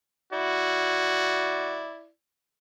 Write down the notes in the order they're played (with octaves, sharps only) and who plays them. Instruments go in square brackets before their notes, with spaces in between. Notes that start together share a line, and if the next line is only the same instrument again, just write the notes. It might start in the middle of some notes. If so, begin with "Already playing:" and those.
[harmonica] E4 D5 [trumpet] F#4